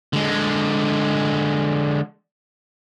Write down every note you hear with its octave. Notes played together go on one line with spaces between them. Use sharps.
D3 G#3